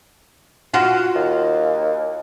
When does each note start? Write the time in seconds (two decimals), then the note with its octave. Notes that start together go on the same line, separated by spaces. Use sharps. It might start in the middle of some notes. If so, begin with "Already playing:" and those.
0.74 F4 F#4 F5
1.15 D#2